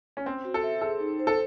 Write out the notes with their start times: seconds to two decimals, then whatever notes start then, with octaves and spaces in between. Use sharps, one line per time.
0.17 C#4
0.26 C4 C5
0.45 F#4
0.54 A4
0.63 E5
0.81 G#4 A4
1.00 D#4
1.19 C5
1.27 A4